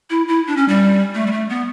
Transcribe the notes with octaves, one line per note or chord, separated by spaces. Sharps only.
E4
E4
D4
C#4
G3
A3
G3
A3
B3